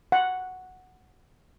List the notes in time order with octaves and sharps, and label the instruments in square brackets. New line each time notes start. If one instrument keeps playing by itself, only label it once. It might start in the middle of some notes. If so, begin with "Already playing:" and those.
[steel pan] F#5